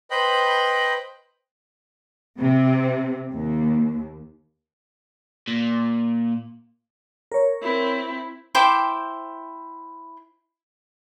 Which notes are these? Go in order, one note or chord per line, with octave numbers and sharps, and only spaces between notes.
B4 C5 D#5 G5 B5
C3
D#2
A#2
A#4 C#5
C4 E4
E4 C5 G5 D6